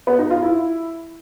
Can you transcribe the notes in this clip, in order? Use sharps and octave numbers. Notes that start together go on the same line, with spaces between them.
B3
D#4
F4
E4